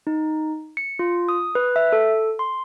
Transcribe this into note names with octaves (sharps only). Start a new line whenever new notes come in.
D#4
C#7
F4
D#6
B4
E5
A4
C6